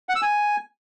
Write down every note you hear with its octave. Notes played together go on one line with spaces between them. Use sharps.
F#5
E6
G#5